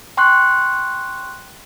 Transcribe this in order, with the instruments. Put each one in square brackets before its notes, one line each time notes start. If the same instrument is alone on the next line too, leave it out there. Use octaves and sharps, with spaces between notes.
[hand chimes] G5 C6 C#6 F#6